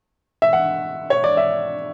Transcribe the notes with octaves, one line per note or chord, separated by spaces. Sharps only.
E5
F#5
C#5
D5
E5